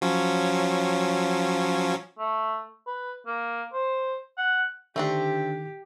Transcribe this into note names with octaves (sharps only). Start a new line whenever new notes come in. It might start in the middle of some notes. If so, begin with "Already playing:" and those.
F3 F#3 C#4
A3
B4
A#3
C5
F#5
D3 D#3 A3 C4 D4 G4